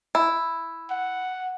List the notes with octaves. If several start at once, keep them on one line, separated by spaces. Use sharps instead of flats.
E4
F#5